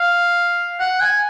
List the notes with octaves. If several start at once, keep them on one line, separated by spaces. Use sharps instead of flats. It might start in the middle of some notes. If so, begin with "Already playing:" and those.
Already playing: F5
F#5
G#5